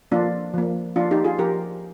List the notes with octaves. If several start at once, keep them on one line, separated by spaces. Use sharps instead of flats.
F3 A#3 D4 F4
F3 A#3
F3 A#3 D4 F4
D#4 G4
F4 G#4
F3 G4 A#4